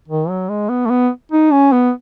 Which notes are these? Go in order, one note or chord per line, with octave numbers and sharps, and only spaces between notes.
D#3
F#3
G#3
B3
A3
B3
D#4
C#4
B3